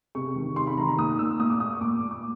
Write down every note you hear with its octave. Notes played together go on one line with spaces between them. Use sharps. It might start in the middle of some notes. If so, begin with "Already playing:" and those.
C3 C#6
D#3
C3 C6
B5
D#3 A#5
A#5
A#2 D#6
A#2 E6
A#2 D#6
D6
A#2 D#6
C#6
A#2 D6
A#2
D6